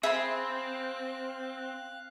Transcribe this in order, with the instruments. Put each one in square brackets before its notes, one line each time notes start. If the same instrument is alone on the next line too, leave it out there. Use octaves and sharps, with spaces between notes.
[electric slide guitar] C4 [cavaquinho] G#4 B5 C6 [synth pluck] E5 [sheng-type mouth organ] F5 F#6